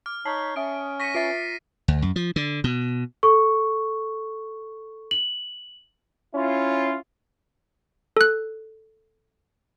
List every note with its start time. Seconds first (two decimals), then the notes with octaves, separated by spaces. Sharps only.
0.06 D6 F6
0.25 D#4 C#5 A5 B6 C7
0.56 C#4 E5 D#6 D7
1.00 C#6 A#6 B6 C#7 D#7
1.15 F4 E5 A6 C7 D7
1.88 D2
2.02 F#2
2.16 F3
2.36 D3
2.64 B2
3.23 A4 C#6
5.11 F#7
6.35 C#4 E4 F4
8.17 A4 F#6